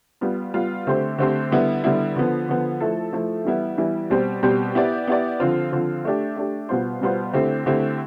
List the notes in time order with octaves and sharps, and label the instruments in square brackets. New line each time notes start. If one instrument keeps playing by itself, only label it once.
[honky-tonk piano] G3 B3 F4
G3 B3 F4
D3 A3 C4 G4 C5
D3 A3 C4 G4 C5
D3 G3 B3 E4
D3 G3 B3 E4
D3 F3 B3
D3 F3 B3
F3 A3 E4 A4
F3 A3 E4 A4
E3 G3 B3 E4
E3 G3 B3 E4
B2 G3 C4 G4 C5
B2 G3 C4 G4 C5
B3 E4 G4 D5
B3 E4 G4 D5
D3 F3 C4 F4
D3 F3 C4 F4
A3 D4 G4
A3 D4 G4
B2 G3 B3 F4 C5
B2 G3 B3 F4 C5
D3 A3 C4 E4 G4
D3 A3 C4 E4 G4